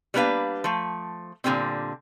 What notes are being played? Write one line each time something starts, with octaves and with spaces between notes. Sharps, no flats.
G3 A#3 B3 D4 B4 F5
F3 A3
A#2 D3 F#3 G3 C4